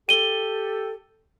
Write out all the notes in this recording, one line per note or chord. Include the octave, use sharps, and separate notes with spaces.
G4 A4 D#7 G7